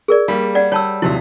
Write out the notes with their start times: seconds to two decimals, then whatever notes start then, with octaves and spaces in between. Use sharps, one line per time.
0.08 G#4 A#4 D5
0.28 G3 A#3 F5
0.55 D5 F#5
0.72 G3 C#5 A5 E6
1.02 D#1 C3 F#3 E4